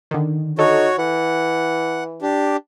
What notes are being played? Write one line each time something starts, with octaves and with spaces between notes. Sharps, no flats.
D3 D#3
D#4 F#4 A4 C#5
E3 F#5
D4 G4